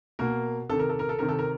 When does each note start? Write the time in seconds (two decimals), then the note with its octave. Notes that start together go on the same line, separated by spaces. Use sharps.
0.19 B2 A#3 A#4
0.69 C3 D#3 A4
0.79 A#4
0.89 A4
0.99 A#4
1.09 A4
1.19 C3 D#3 A#4
1.29 A4
1.39 A#4